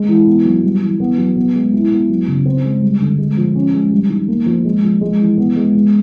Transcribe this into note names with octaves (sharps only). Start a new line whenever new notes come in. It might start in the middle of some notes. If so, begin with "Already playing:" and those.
Already playing: G#3
E3
B3
F#3
G3
E3
B3
F#3
B3
G#3
E4
B3
F#3
C#3
C4
G#3
G3
D3
G#3
F3
C#4
G#3
G3
D#3
A#3
F3
G#3
F3
G#3
E3
B3
G#3
G#3